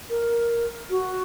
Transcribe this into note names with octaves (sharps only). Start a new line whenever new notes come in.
A#4
F#4